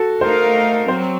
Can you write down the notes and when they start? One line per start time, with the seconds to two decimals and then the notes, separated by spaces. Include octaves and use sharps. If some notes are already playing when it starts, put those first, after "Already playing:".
Already playing: F#4 A4
0.21 A3 D#4 A#4 C5 F5
0.88 F#3 C4 C5